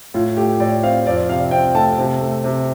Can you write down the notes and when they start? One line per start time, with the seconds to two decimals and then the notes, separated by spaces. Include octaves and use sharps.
0.14 A2 F4
0.37 A3 G4
0.60 A2 D5
0.83 C4 F5
1.06 F2 D5
1.29 C3 F5
1.51 C4 G5
1.75 A3 A5
1.98 C3
2.21 A3
2.44 C3